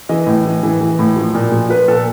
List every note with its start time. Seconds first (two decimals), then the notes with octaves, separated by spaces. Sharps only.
0.09 E3 D#5
0.27 A2
0.45 E3
0.63 E3
0.81 E3
0.99 A2
1.16 F3
1.34 A#2
1.52 F3
1.70 F3 B4
1.88 A#2 A4